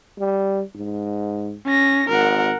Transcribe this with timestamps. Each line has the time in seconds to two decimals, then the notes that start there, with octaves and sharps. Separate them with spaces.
0.19 G3
0.76 G#2
1.65 C#4 A#6
2.09 G#1 A#4 F#5